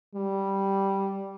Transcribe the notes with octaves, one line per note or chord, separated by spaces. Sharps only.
G3